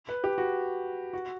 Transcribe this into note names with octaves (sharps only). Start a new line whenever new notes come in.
B4
G4
F#4
F#4